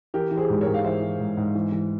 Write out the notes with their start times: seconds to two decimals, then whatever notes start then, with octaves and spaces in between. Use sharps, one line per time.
0.14 E3 G4 A#4
0.31 E3
0.37 G#4 C5
0.50 G#2
0.61 A#4 C#5
0.67 G#2
0.74 F5
0.84 E3 C5 E5
1.02 E3
1.20 G#2
1.37 G#2
1.55 E3
1.72 E3